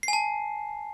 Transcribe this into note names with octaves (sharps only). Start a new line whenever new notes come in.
C7
G#5
A5